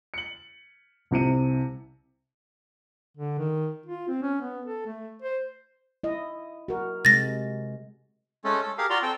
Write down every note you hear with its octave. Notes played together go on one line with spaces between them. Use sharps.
C#7 F#7
C2 C3 C#7 D#7
D3
D#3
F4
C4
C#4
B3
A4
A3
C5
E4 D#5
F#4 A#4
C3 G#3 A6 A#6
G#3 A3 C#4 A4
A4
G4 G#4 A#4 F5
F4 F#4 D5 A#5 C6
C4 A4 G5